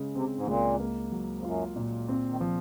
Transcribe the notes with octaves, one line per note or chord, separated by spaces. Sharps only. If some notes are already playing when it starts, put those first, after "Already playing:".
Already playing: C#3 G#3
C3 C4
G#2
C#2 A#2
A#3
F#3
F2
F#2 F4
A#2
G#2 C4
D#3
F3